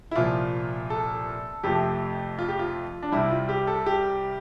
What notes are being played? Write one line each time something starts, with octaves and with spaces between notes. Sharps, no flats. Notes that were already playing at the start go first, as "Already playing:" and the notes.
E4
C2 A#2 F3 F4
A4
F2 C3 F3 A3 G4
F4
G4
F4
D4
C2 C3 G3 E4
F4
G4
A4
G4